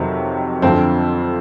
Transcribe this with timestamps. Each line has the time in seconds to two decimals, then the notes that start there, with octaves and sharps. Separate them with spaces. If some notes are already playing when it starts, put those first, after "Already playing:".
Already playing: F2 C3 D#3 F#3 C4
0.62 F2 D3 F3 C4